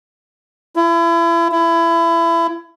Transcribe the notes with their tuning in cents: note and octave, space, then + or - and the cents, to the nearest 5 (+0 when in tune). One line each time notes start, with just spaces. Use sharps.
E4 +35
E4 +25